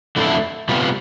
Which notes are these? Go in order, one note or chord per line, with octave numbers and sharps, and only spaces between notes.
F2 D3 A3 E4
C3 G3 B3 F4